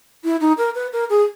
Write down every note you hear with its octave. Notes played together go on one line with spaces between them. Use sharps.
E4
D#4
A#4
B4
A#4
G#4